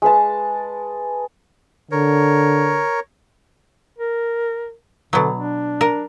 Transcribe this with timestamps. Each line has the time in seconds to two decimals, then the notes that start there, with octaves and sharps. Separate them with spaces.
0.02 G#3 B4 A5
1.91 D3 A#4 C#5
3.98 A#4
5.13 B2 D3 F#3
5.34 D4
5.81 A#4